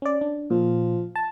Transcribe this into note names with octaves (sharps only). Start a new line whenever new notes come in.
C#4 D5
D4
A#2 F3
A5